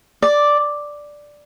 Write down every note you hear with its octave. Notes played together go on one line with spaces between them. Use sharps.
D5